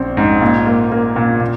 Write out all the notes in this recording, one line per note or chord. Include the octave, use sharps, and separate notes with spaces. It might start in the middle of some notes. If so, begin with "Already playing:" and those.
Already playing: A#1 C4
G#2
A#2
A#3
A#3
A#2
A#2